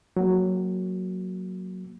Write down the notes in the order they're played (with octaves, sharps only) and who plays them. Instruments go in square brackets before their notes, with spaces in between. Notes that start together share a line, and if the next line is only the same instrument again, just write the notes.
[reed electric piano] F#3 A#3